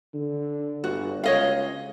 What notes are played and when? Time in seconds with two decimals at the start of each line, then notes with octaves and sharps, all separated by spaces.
0.14 D3
0.84 G1 F#4
1.24 C#2 C#5 D#5 F5